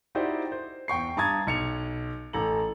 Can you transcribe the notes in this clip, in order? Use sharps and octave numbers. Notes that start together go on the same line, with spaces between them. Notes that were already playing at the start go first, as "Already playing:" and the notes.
D#4 E4 F#4 G4 C5 D5
C5
E2 G5 C#6 C7
G2 A5 A#5 D#6 G#6 A6
B1 C#7 F7
A1 A4 A#5 F#7